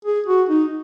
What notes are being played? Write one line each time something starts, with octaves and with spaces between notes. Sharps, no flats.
G#4
F#4
D#4